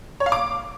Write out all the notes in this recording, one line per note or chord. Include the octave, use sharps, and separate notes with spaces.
C#5
F5
D6